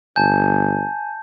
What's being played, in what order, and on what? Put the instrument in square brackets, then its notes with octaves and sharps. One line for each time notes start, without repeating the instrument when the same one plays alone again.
[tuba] G1 [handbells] G#5 [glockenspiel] A5 G6